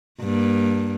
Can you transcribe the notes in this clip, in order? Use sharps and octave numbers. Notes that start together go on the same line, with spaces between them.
G2 A#3